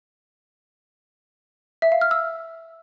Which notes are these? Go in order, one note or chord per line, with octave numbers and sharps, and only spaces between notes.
E5
F5
F6
E6